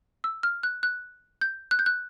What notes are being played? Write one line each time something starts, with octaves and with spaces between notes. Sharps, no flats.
E6
F6
F#6
F#6
G6
F#6
G6
F#6